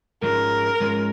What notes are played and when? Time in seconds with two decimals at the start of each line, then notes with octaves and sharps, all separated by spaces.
0.23 G#2 F3 G#3 C#4 A#4
0.80 G#2 F3 G#3 C#4